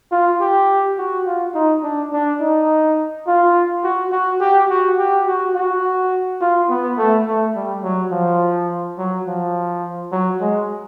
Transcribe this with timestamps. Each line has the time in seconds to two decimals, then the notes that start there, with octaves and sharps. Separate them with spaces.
0.12 F4
0.41 G4
0.98 F#4
1.26 F4
1.54 D#4
1.83 D4
2.13 D4
2.41 D#4
3.27 F4
3.84 F#4
4.12 F#4
4.41 G4
4.69 F#4
4.98 G4
5.27 F#4
5.55 F#4
6.41 F4
6.69 B3
6.97 A3
7.26 A3
7.55 G3
7.83 F#3
8.11 F3
8.98 F#3
9.27 F3
10.12 F#3
10.41 G#3